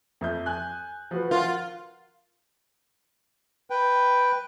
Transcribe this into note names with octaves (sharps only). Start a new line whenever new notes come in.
F2 E5 G6
G#5 F#6
F3 F#4 B4
F4 A#4 F#5
B4 G5